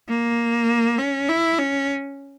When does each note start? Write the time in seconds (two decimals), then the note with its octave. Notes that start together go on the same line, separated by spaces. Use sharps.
0.08 A#3
0.98 C#4
1.29 E4
1.59 C#4